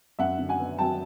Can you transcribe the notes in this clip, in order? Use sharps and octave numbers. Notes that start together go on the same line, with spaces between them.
F#2 E5 F#5
D3
F#5 G#5
B3
F#3 G5 A5